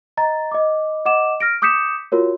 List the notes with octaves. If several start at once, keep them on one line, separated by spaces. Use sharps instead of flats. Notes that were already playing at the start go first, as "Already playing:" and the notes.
D#5 A#5 A6
D#5 D6
D#5 F#5 D6 E7
F6 A#6 D7
D6 D#6 G6 B6 C#7 E7
F4 F#4 A#4 C#5